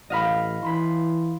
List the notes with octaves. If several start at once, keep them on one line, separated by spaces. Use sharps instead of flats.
A1 D#5 F5 B5
E3 B5 C6